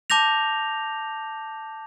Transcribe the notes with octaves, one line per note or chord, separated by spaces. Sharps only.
A5 D6 G6 A#6 F7